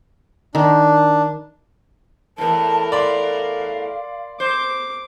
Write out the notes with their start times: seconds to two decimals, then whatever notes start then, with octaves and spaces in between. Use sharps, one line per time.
0.55 D#3 D4
2.38 E2 A2 A#4 A5
2.92 D5 F5 B5 C6
4.40 C5 D6